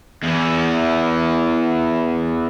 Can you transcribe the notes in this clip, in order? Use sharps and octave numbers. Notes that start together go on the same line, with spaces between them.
E2 E3